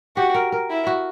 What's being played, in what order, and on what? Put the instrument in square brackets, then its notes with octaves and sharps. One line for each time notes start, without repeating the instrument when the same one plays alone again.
[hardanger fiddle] F#4 [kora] G4
[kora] A#4
A#4
[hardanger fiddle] E4
[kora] F#4